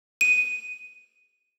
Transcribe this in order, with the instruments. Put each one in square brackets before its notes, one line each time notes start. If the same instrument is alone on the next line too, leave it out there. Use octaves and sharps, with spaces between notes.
[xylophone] D#7